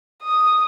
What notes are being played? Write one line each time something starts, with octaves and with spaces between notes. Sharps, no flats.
D#6